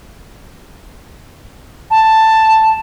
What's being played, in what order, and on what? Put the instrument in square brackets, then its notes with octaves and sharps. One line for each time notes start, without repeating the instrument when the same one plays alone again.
[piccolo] A5